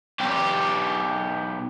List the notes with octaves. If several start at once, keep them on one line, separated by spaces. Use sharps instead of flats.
B1 G4